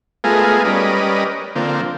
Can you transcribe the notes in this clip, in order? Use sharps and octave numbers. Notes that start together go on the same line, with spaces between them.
G#3 A3 B3 F4 G#4 A#4
G3 C#4 A#4 B4 D5 D#5
D3 F3 A#3 C4